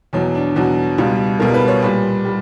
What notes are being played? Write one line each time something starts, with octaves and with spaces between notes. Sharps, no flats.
E2 B2 F#3
D4
E2 B2 F#3 F#4
C#2 B2 G3
C#2 B2 G3 A#4
B4
C#5
A#2 G3 B4
G3